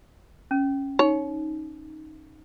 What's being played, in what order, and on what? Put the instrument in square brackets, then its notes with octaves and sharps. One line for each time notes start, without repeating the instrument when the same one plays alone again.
[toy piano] C#4
[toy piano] D#4 [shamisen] C#5